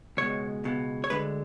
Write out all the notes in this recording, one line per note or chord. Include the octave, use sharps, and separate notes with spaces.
C#2 B2 G#3 C#5
C#2 B2 G#3
C#5
D2 D3 G#3 B4